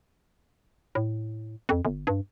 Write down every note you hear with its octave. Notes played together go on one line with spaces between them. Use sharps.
A2
F2
G1
G2